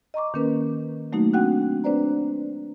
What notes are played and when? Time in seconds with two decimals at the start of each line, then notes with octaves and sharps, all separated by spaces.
0.14 D#5 A#5 C#6 D6
0.34 D#3 A#3 C#4 A#4 B4
1.13 F#3 A3 A#3 D#4 F#4
1.33 C4 D4 F#4 F#5 G5 F#6
1.84 C4 D4 B4 C5 D5 A#5